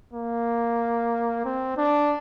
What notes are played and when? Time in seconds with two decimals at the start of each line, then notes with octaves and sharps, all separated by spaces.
0.13 A#3
1.45 C4
1.77 D4